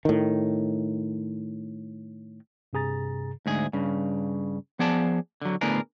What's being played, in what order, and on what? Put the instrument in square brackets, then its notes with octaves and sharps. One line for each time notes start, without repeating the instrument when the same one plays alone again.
[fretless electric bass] A2 D#3
[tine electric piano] G2 C3 G#4 A#5 A6
[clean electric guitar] D2 G#2 G#4
G2 C#3
F3 B3 G#4 D5 A5
D3 F#3
D2 A2 B3 D4 G#4 A#4